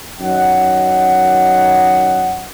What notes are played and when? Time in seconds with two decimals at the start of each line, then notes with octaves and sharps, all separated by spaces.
0.20 F#2 D#3 D#5 F#5